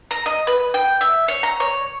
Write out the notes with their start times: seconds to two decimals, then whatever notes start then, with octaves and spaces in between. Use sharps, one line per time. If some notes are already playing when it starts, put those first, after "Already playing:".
0.11 A#5
0.26 D#5
0.47 B4
0.74 G5
1.01 E5
1.28 C#5
1.43 A#5
1.60 C#5